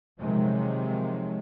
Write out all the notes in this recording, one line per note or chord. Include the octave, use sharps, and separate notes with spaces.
C3 D#3 F3 F#3 G#3